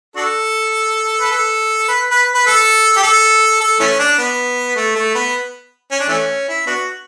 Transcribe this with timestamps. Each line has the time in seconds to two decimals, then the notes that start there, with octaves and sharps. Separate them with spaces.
0.16 D4 F#4 A4
1.21 B4
1.31 A4
1.88 B4
2.11 B4
2.35 B4
2.47 A4
2.96 G4
3.03 A4
3.61 A4
3.80 E3 A3 C#4
3.99 D4
4.19 B3
4.76 A3
4.95 A3
5.15 B3
5.91 C#4
6.00 D4
6.09 E3 A3 C#4
6.49 E4
6.67 B3 D4 F#4